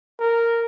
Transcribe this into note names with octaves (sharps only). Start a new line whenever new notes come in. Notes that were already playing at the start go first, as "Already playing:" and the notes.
A#4